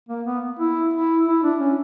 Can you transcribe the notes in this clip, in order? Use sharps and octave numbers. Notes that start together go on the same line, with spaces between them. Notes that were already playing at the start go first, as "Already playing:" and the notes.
A#3
B3
E4
E4
E4
D4
C#4